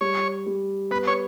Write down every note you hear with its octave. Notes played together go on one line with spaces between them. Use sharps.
G3 C#5
G3
B3 B4
C#5